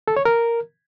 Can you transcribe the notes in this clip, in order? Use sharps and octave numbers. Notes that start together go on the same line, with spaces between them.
A4
C#5
A#4